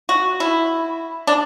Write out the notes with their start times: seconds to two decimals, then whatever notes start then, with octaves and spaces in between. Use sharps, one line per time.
0.09 F#4
0.40 E4
1.27 D4